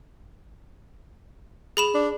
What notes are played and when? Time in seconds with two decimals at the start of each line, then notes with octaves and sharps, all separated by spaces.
1.77 G#4 B5 E7
1.94 D4